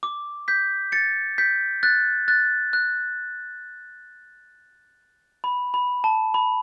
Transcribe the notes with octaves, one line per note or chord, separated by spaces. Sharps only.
D6
G6 B6
A6 C#7
G6 B6
F#6 A6
F#6 A6
F#6
B5
B5
A5
B5